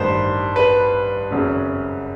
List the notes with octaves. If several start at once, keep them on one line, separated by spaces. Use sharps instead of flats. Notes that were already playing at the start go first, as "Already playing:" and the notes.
Already playing: A1 G2 D#3 C5
B4
G#1 F#2 C#3